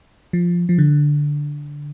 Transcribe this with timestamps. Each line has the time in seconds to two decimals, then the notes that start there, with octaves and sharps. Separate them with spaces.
0.33 F3
0.69 F3
0.78 D3